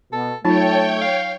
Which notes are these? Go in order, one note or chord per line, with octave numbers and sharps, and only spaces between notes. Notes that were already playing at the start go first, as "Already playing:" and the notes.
B2 A4
F#3 A3 D#4 F4 C#5 G5 A5
F5